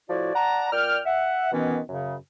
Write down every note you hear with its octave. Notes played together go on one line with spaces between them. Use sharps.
A2 F3 E4 F#4 D5
D5 F#5 A5 A#5
A#2 D5 G5 F6
E5 F#5
B2 D#3 E3 B3 C#4
F#2 C#3